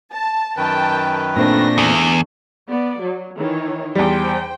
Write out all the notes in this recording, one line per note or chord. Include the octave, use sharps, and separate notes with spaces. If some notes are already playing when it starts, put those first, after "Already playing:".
A5
F#2 D#3 B4 G5 A5
A#2 A3 C4 D4 A#6
E2
B3 D5
F#3
D#3 E3 C#5
E2 G3 C5 G5